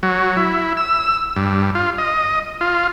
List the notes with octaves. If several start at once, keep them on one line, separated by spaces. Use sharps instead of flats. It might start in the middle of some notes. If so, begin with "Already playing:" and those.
F#3
E4
E6
G2
F4
D#5
F4